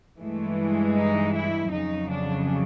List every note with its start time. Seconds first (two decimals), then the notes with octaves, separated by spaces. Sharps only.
0.18 G2 E3 G#3 A3
0.95 D#4
1.33 E4
1.71 F2 C#3 F#3 D#4
2.09 D4